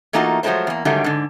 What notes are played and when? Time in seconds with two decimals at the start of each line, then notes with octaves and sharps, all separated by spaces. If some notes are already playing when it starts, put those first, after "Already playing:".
0.13 E3 A3 A#3 D#4 F4 F#4
0.43 F3 F#3 G#3 A3 D#4 C5
0.67 E2 A#3
0.85 G#2 D3 D#3 F#3 G3 A3
1.04 G#2 D3